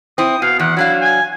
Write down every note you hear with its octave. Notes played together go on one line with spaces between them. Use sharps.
C4 E4 D#6
B2 F5
E2 F#5
F#3 D4 E4 F5
G#5